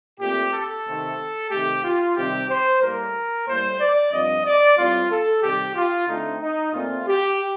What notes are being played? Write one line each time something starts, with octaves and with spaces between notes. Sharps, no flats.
A#2 A3 C4 G4
A4
C3 D#3 A3 C4
C3 D#3 A3 G4
F4
C3 D#3 G3 C4 G4
C5
A2 G3 A#3 A#4
A2 G3 A#3 C5
D5
G2 F3 C4 D#5
D5
A2 G3 C4 F4
A4
C3 D#3 G3 G4
F4
D3 A3 C4 D#4
D#4
A#2 A3 C4 F4
G4